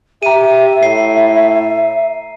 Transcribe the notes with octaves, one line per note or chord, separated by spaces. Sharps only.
G4 E5 A#5 D#7
A2 C7